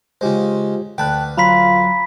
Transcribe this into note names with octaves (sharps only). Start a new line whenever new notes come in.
C#3 G#3 F4 G4 C5
D2 B4 G5 A5 F#6
F#3 F4 A#5 B5 B6